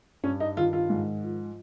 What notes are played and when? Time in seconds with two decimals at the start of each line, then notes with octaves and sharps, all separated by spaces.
0.23 G2 C#4
0.40 D#4
0.57 D#3 F4
0.73 F4
0.90 G#2
1.23 F3